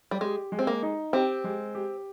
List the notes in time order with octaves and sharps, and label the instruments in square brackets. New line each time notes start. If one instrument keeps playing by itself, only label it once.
[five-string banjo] G3
[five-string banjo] G#3 [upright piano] G4
[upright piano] G#3
[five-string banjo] C4
A#3
[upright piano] D#4
[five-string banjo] C4 [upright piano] G4
[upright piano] G#3
G4